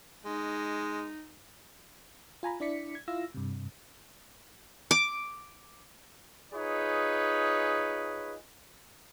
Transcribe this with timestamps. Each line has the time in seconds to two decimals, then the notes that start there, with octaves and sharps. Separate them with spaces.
0.25 G#3 D#4
2.43 F4 G#5 A#5 B5
2.60 D4 E4 D5 B6 C#7
2.95 G#6
3.08 E4 F4 F5 E6 A#6
3.34 G2 C3
4.91 D6
6.53 D#4 F4 G#4 B4 C#5